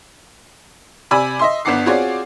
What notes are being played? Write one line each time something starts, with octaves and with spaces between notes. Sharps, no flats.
C3 D5 G#5 B5 E6
D#5 E5 C6
G1 B3 D4 F#5 D6 C7
C4 F4 F#4 G#4 C#5 D5